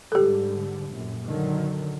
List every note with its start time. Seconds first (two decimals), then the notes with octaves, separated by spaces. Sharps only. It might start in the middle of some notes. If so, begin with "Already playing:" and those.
0.12 G#2 D3 G3 G4 A4
0.90 A#1 F#2 A2
1.27 D3 D#3 F#3